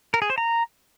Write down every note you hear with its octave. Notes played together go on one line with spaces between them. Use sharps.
A#4
G#4
C5
A#5